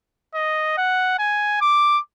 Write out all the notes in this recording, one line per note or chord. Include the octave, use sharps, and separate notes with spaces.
D#5
F#5
G#5
D6